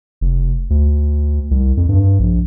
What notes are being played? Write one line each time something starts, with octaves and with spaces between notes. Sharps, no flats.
F1
D2
C2
F2
G2
A#1